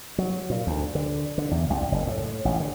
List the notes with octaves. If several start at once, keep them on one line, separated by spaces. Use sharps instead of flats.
F#3
A#2
D2
D3
D3
E2
C2
F#1
A2
A1
D3